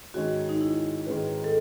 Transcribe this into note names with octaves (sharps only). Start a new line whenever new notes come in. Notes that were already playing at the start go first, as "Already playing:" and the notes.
G#2 D#3 G#3 C#4 F#4
D#4
E4
G#2 D#3 G#3 C#4 B4
A4